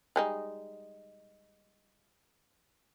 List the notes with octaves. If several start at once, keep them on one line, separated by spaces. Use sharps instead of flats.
G3 G#3 D#4